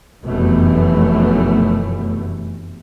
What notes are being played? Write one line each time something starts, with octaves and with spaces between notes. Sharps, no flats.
F1 F#2 B2 E3 A3 B3